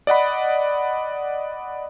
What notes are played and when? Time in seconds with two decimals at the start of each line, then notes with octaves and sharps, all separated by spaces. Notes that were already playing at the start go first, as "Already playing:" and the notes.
0.07 D5 D#5 F#5 B5